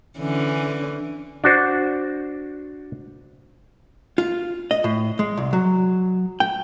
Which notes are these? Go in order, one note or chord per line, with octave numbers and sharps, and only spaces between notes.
D3 E3 C#4
D4 F#4 C5
F4
D#5
A2
G#3
C2
F#3
G5